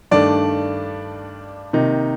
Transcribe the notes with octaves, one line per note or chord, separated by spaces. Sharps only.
G2 D#3 A3 D4 D5
C3 D#3 A#3 D#4